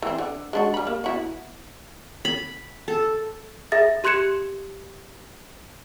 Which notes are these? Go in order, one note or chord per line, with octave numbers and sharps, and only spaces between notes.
E3 C4
D3
G#3 D4 F#4
G3 B5
A#3
B3 E4 F#4
B5
A4
G#4 E5 A6
G4 C6 F#6 G#6 C#7 E7